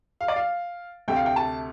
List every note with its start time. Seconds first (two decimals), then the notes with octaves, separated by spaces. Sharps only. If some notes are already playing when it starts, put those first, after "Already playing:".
0.21 F5
0.28 D5
0.36 F5
1.08 D2 C3 A3 G5
1.16 F5
1.26 G5
1.36 A5